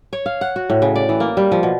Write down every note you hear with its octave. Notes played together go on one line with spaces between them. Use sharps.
C#5
F5
F#5
F#4
A2
C#3
D5
E3
A#3
G3
F3
B2